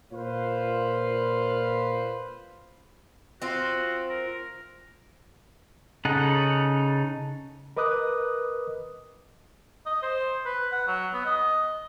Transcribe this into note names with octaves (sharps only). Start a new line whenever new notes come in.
A#2 F4 B4 C5 F5
C4 F4 F#4
A#4
C#3 D#4 A4 F#5
A#4 B4 D#5 D6 D#6 F#6
D#5
C5
B4
F#5
F#3
B3
D#5